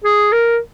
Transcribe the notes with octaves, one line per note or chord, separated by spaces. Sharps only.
G#4
A#4